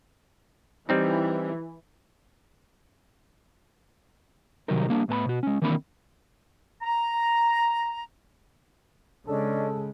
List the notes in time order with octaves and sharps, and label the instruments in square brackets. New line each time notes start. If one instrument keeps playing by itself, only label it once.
[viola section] E3 [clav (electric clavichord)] G3 C4 D#4
[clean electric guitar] C3 D#3 F#3 G3 D#4 A#4
G3 A#3 D4
A2 B3 A5 B5
B2 F#4
G#3 C#4
D#3 E3 A#3 C4 D4 B5
[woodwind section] A#5
[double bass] C#3 G#3 [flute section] C#4 D4 D#5 [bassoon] A4